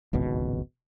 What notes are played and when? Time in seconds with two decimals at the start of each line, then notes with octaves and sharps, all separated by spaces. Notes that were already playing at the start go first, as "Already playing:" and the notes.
0.13 D1 G#1 C#2 B2